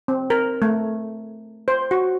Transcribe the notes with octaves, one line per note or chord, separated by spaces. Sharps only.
C4
A#4
A3
C5
F#4